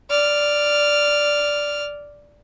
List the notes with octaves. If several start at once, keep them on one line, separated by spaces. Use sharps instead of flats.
D5 F6